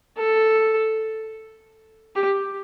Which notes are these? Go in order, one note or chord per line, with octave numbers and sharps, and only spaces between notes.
A4
G4